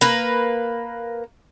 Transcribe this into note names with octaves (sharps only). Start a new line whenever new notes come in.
A#3 B4